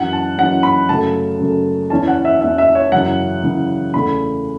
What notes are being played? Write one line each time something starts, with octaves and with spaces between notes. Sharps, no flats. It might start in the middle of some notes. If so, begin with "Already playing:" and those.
Already playing: F#2 E3 C#4 F#5
A5
F#2 E3 C#4 F#5
B5
F#2 C#3 A3 A5
F#2 C#3 A3
E2 E3 C#4 A5
F#5
E5
E2 E3 C#4 E5
E5
C#5
F#2 C#3 E3 C#4 F#5
F#2 C#3 E3 C#4
E2 C#3 A3 B5